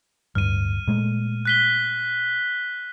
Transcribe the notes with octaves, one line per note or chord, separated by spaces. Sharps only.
D1 G2 F6 D#7
A#2 G#3 A3
F#6 B6 G7